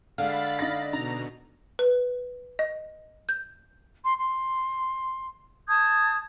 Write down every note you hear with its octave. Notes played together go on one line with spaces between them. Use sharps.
D3 G#3 F5 B5 A6
D#4 D5 A#6
B2 D#4 A#5
B4
D#5
G6
C6
C6
A5 D#6 G6 G#6